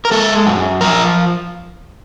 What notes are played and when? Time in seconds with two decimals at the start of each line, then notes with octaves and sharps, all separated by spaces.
0.05 A#4
0.11 G#3 A4
0.47 F#2
0.81 F3 A#4